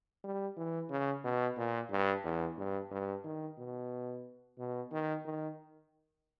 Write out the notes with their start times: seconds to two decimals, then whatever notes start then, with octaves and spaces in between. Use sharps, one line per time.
0.24 G3
0.57 E3
0.90 C#3
1.24 B2
1.57 A#2
1.91 G2
2.24 E2
2.57 G2
2.91 G2
3.24 D#3
3.58 B2
4.58 B2
4.92 D#3
5.25 D#3